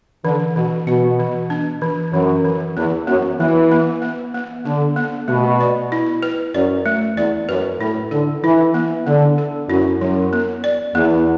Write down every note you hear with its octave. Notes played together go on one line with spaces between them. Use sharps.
D3 E3
B2 E3
B2 F#4
E3
D4
E3
F#2 E3
E3
E2 B3
F#2 B3
E3 B3
B3
B3
B3
D3 B3
B3
B2 A3
D5
E4
B4
F#2 D5
A3
E2 D5
F#2 B4
A2 E4
D3 A4
E3 E4
B3
D3 B3
A4
F#2 E4
F#2 F#3
B3
D5
E2 B3